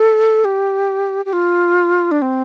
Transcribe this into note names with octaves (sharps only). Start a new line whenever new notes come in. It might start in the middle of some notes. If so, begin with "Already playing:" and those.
Already playing: A4
G4
G4
F4
D4
C4